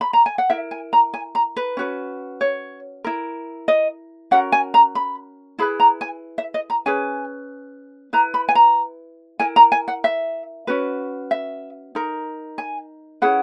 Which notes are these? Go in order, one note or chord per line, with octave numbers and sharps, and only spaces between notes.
B5
A#5
G#5
F#5
E4 A#4 E5
G#5
A#5
G#5
A#5
B4
C#4 F#4 B4
C#5
E4 A#4
D#5
C#4 F#4 A#4 F#5
G#5
A#5
B5
E4 G#4 B4 B5
A#5
G#5
E5
D#5
A#5
C#4 G#4 B4 G#5
E4 B4 A#5
B5
G#5
A#5
E4 A#4 G#5
A#5
G#5
F#5
E5
C#4 F#4 B4
E5
D#4 A#4
G#5
C#4 E4 G#4 B4 F#5